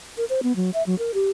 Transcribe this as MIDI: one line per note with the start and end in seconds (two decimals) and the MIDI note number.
0.17 0.25 70
0.30 0.41 72
0.43 0.55 59
0.56 0.70 54
0.74 0.83 76
0.86 0.97 54
0.99 1.12 70
1.14 1.30 67